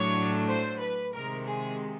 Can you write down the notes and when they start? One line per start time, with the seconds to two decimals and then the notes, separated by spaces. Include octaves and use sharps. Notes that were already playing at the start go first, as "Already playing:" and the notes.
Already playing: A2 F#3 A3 D4 C#5
0.48 C5
0.81 B4
1.14 C3 D#3 G#3 A#4
1.47 G#4